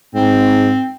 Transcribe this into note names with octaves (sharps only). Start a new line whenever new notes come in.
G#2 C4